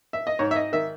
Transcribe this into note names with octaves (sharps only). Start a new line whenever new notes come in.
E5
D#5
G#2 C#5
E5
D#5
D#3 E5